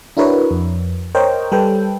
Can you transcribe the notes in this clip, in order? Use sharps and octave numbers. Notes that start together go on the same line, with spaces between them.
D4 E4 F#4 A#4 B4 C#5
F2
A#4 C5 C#5 D#5 G5
G3 A4 B4 G5